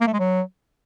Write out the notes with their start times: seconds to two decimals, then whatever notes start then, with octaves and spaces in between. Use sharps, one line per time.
0.01 A#3
0.07 A3
0.13 G#3
0.20 F#3